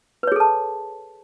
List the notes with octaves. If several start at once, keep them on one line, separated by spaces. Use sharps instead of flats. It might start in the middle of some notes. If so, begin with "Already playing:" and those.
G#4 A4 B4 C#5 A5